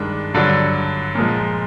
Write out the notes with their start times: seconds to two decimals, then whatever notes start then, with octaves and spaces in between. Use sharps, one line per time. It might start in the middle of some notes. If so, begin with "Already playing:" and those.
Already playing: G2 D#3 G#3 D4
0.34 G2 D3 F#3
1.15 A#2 F3 G#3